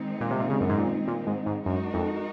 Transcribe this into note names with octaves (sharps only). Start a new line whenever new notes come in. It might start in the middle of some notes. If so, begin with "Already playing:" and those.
Already playing: D#3 G#3 C4 D#4
A#2
C3
A#2
C#3
F#2
G#2
A#2
A#2
G#2
G#2
F#2 G#3 D#4 F#4 A#4
F2